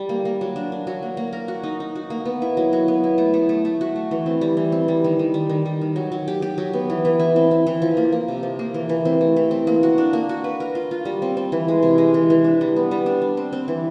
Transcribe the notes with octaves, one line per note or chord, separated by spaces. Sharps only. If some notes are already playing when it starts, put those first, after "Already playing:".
Already playing: G3
A#3
A#3
F#3
D4
D4
F#3
A#3
A#3
A#4
F#4
D#4
D#4
F#4
A#3
B3
E4
F#3
F#3
B3
E4
A3
A3
A3
A3
F#4
A3
E3
C4
G3
E3
C4
G3
D#3
D#3
G3
D#3
G3
D#3
F#3
F#3
G4
G4
F#3
B3
E3
E3
E4
C4
C4
E3
F3
A#3
A#3
C3
F3
A#3
E3
E3
C4
A3
E3
C4
A#3
F#4
D4
A#3
F#4
B4
A#4
F4
F4
G3
C4
C4
E3
G#3
C3
G#3
E3
E3
D4
G3
B3
G3
D4
D4
C4
C4
E3